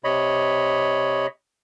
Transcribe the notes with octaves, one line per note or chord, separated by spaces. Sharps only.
C3 C#5 D#5 B5